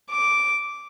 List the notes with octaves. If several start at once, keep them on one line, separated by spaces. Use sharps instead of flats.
D6